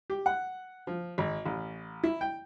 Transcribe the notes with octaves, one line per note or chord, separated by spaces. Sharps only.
G4
F#5
F3
G#1
A1
E4
G5